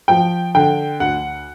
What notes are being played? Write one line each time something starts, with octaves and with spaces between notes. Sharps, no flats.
F3 G5
D3 G5
D2 F#5